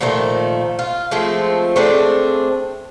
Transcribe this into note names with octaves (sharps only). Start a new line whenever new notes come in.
A#2 D#3 F3 A3
F4
F3 G#3 A3 C4
A3 C4 D4 G#4